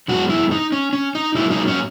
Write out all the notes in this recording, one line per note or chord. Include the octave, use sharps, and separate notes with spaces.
F#2 E3 G#3 B3 F#4
E4
D#4
C#4
C#4
D#4
G#2 F#3 A#3 E4
D#4
C#4